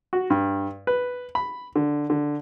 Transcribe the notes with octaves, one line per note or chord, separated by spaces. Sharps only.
F#4
G2
B4
B5
D3
D3